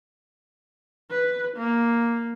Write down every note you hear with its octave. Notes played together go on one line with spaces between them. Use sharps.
B4
A#3